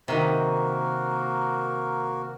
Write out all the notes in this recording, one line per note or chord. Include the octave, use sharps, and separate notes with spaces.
C3 D#3 A#3 F#4 A#4